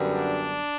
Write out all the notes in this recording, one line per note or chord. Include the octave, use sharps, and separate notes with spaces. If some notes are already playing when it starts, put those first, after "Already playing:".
Already playing: F#2 D3 G3 B3
D4